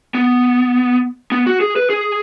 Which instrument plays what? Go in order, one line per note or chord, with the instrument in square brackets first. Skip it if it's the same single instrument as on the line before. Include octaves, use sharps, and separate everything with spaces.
[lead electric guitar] B3
B3
F#4
G#4
B4
G#4